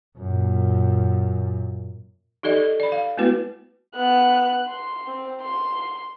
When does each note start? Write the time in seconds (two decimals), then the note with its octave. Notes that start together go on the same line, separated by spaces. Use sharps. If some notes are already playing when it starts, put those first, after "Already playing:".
0.17 F#2 A#2
2.43 D#4 G4 A4 D5 D#5
2.57 A4
2.80 D5 B5
2.92 F5
3.17 G#3 A3 B3 E4 F#4 B4
3.95 B3 F#6
4.68 C6
5.07 C4
5.42 C6